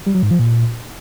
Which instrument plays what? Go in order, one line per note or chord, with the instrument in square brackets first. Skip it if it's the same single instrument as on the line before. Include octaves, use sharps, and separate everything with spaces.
[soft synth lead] G3
F#3
G#2
F3
A#2